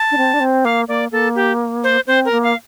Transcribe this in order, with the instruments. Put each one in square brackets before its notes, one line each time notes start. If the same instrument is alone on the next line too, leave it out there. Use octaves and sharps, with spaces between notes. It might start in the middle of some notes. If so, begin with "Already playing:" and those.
Already playing: [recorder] A5
[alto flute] D4
C4
D4
C4
[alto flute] A#3 [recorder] F5
[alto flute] A#3 [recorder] D5
[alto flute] A#3 [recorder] A4
[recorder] G4
C5
[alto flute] C4 [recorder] C5
[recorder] A#4
[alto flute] A#3
[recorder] F5